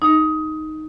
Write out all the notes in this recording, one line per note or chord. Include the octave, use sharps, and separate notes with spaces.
D#4